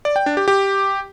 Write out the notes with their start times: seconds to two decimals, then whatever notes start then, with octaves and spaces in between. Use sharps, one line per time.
0.05 D5
0.16 G5
0.26 D4
0.37 G4
0.48 G4